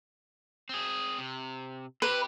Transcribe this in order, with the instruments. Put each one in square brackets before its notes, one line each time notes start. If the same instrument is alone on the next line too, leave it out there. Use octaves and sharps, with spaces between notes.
[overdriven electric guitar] C4 G#4
C3
[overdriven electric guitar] C4 G4 [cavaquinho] B4